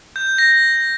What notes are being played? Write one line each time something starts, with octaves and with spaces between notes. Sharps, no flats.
G6
A#6